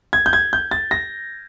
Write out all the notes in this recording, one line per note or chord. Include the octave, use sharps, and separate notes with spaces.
G#6
G6
G#6
G6
A6
A#6